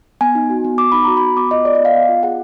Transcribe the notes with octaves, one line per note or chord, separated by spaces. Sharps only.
B3 G#5
D#4
F#4
B3
B3 D6
D#4 B5
F#4 A#5
B5
B3
B3 D6
F4 D#5
G#4 D5
D#5
B3
F5
B3
F4
G#4 F#5